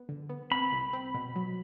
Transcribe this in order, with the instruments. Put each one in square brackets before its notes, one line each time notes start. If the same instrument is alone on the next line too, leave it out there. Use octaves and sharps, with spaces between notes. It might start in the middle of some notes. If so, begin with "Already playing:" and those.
Already playing: [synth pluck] B3
D3
B3
[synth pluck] C4 [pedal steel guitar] B5
[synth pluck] C2
C4
B2
F#3